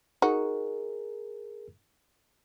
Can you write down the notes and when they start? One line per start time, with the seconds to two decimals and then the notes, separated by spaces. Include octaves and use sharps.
0.22 D#4 F#4 G#4 A#4